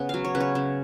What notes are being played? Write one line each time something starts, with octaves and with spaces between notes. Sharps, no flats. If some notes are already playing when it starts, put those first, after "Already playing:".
Already playing: C#3 B3
F#3 F5
C#5
C#3 B4
C#5
C#3